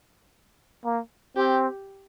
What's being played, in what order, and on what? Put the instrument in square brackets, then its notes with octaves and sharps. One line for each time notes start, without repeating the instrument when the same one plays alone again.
[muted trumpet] A#3
[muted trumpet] C4 [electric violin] G4